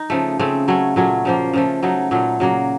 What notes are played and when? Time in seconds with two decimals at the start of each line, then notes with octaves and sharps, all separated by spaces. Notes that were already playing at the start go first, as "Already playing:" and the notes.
Already playing: D#4
0.10 C#3 F3 A3
0.39 C#3 A3 C4
0.68 F#3 A3 C#4
0.96 A#2 F#3 A3 C#4
1.25 C#3 F3 A#3
1.53 C#3 F3 A3
1.83 C#3 F#3 A3 D#4
2.11 A#2 F#3 A3 D#4
2.40 C#3 F#3 A#3